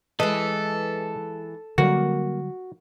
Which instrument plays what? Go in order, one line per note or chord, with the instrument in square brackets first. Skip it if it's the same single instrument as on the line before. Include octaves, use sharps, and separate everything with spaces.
[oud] E3 G#3 [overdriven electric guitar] A4 [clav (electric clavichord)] D#5
[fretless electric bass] D3 F#3 G3 [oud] A#3 [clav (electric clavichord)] F#4